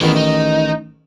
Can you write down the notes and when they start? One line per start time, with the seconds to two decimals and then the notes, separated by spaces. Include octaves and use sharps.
0.01 A1 D#3 E3 B3
0.16 D#4